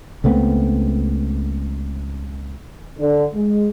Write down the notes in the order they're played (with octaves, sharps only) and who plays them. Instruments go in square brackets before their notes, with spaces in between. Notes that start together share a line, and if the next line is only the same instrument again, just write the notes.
[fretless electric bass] C#2 A3 B3 C4
[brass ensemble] D3
G#3